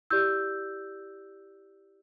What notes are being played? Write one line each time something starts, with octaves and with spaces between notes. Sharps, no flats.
E4 G4 D5 E6 G6